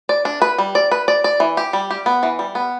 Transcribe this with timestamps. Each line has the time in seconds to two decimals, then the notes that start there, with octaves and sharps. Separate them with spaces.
0.09 D5
0.25 D4
0.42 B4
0.58 G3
0.75 D5
0.91 B4
1.08 D5
1.24 D5
1.40 E3
1.57 G4
1.73 G3
1.91 G4
2.06 B3
2.23 E3
2.39 G3
2.55 B3